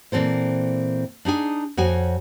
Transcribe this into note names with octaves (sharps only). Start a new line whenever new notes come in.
A#2 E3 C4 A4 C5
D4 D#4 G#4 G#5
F2 F#4 C#5 G#5